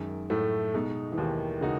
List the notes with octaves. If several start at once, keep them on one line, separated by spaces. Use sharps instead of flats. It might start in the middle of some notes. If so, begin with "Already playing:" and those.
Already playing: F#2 D#3 G#3
A2 A3
B2 G#3 D#4
E3
D#2 D#3
C#3 G#3 D#4 F#4